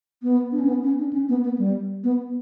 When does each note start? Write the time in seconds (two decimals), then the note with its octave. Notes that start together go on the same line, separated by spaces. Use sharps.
0.23 B3
0.52 D4
0.60 C#4
0.67 B3
0.83 C#4
0.99 D4
1.13 C#4
1.29 B3
1.44 B3
1.58 G3
2.04 B3